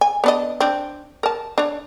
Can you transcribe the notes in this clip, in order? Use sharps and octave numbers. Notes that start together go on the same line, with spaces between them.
G#5
B3 D4 D#5
C4 D4
A#4 A5
D4 C#5